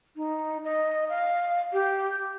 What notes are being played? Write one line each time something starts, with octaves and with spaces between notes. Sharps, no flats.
D#4
D#5
F5
G4